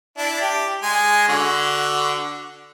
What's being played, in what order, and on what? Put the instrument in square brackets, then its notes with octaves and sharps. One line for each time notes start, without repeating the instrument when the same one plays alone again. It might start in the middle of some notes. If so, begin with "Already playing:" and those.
[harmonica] D4 E4
G4
G#3 G#5
D3 F#4